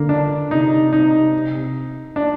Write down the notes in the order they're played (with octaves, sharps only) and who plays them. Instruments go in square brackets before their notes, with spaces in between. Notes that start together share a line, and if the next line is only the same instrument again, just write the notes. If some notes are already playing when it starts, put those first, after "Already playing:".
Already playing: [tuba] D3 [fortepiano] A#3
[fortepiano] D4
[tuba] C3 [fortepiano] D#4
[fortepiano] D#4
D4